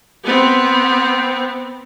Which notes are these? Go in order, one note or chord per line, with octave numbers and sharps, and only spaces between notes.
B3 C4